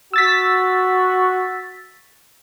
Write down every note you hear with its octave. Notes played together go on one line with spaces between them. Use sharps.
F#4 E6 A6 B6